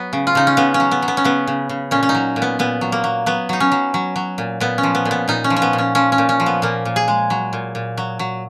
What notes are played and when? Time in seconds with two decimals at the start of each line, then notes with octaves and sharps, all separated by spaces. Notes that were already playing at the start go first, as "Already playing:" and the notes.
Already playing: F#3 B3
0.13 C#3
0.27 F4
0.35 C#3 D#4
0.47 C#4
0.57 C#3 B3
0.74 C#4
0.80 F#3
0.91 B3
1.02 F#3
1.08 B3
1.17 C#4
1.24 C#3 B3
1.47 C#3
1.69 C#3
1.91 A#2 C#4
2.03 C#4
2.09 D#4
2.15 F#3
2.36 A#2
2.42 B3
2.59 A#2 B3
2.81 F#3
2.92 A#3
3.04 F#3
3.26 F#3 B3
3.49 F#3 D#4
3.60 C#4
3.72 F#3
3.94 F#3
4.16 F#3
4.38 A#2
4.60 A#2 B3
4.78 C#4
4.83 F3
4.95 B3
5.05 A#2
5.11 B3
5.28 A#2 D#4
5.44 C#4
5.50 F3
5.56 C#4
5.62 B3
5.73 A#2
5.78 C#4
5.95 F3 C#4
6.12 C#4
6.18 A#2
6.29 C#4
6.40 F3
6.46 B3
6.62 A#2 A#3
6.85 A#2
6.96 G#4
7.08 G#3
7.30 F#3
7.53 A#2
7.75 A#2
7.97 F#3
8.19 F#3